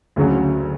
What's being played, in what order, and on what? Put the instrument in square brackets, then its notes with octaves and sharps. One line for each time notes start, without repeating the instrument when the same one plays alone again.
[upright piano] D2 C#3 F#3